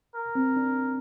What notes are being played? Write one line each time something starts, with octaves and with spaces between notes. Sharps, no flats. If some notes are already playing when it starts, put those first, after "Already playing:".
A#4
C4
D4